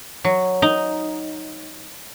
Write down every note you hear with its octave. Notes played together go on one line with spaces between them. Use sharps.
F#3
D#4